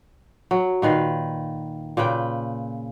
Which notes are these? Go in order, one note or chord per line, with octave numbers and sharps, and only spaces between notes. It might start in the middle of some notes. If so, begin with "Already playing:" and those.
F#3
A#2 D#3 B4 F5
A#2 C#3 B4 G5